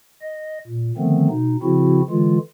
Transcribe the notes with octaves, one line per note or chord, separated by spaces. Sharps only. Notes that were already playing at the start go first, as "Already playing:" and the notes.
D#5
A#2
D3 D#3 F3 A3 B3 C4
B2 D#4
C#3 F3 C4 E4 F#4
D3 E3 G#3 F4